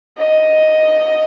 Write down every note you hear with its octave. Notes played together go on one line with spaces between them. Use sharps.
D#5